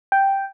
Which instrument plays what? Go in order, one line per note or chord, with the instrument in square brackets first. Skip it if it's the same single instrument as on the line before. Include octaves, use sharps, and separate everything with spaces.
[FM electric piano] G5